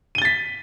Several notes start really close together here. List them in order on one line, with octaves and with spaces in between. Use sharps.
D#7 G7 A6 B6